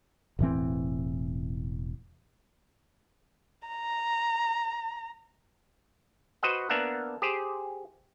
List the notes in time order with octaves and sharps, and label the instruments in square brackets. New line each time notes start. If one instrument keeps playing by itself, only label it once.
[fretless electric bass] E1 A2 E3 C4
[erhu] A#5
[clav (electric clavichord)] F#4 B4 C5 D#5 F#5
A#3 B3 D4 E5 F#5 A#5
G4 G#4 C5